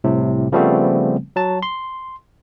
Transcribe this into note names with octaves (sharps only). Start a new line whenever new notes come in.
C2 A2 C3
C#3 F3 G3 A3 B3 C4
F#3 A5
C6